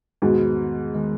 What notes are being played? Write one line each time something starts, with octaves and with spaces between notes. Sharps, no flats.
E2 G#2 B2 D#3 G#3
D#3 G#3